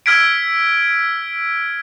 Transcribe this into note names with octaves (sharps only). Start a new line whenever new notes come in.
E6 F6 G#6 B6 D7